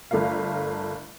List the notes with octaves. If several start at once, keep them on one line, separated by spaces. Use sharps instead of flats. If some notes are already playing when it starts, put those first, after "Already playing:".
G1 A3 F4 A#4 F5